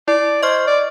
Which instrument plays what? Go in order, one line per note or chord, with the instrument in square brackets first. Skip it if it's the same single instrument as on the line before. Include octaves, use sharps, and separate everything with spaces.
[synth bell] E4 [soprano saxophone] D5
[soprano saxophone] C5 [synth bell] D#5 C#6 F6
[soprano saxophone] D5